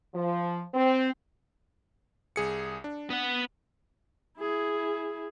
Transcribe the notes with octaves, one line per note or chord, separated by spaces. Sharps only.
F3
C4
C2 G#4 C#7
D4
B3 F#5
E4 G#4